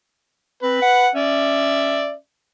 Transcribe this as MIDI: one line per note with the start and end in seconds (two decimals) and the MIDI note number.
0.63 0.79 60
0.63 1.06 71
0.82 1.10 78
1.15 2.17 61
1.15 2.12 74
1.15 2.12 76